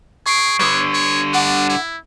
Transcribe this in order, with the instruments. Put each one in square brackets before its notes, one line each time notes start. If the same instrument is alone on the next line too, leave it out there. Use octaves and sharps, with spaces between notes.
[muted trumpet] G#4 [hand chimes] C#6 C7 D7
[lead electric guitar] D3 G3 [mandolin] B4 D#6 [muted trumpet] C#5
[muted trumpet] C#5
[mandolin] A3 F#5 D6 [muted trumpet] D4
[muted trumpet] E4